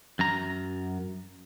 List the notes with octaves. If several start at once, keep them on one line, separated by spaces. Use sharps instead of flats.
F#2 A#5